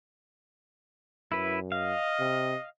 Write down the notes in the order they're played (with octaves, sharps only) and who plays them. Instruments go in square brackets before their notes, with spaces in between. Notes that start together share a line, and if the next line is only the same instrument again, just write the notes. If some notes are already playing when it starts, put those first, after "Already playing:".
[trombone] F#2 [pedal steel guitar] E4 B4
[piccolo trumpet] D#5 [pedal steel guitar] F5
[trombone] C3